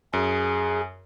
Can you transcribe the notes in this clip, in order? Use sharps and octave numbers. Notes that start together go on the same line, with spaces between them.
F#2 G#4